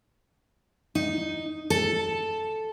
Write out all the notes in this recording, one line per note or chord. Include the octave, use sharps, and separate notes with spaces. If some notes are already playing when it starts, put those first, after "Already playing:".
D#4
A4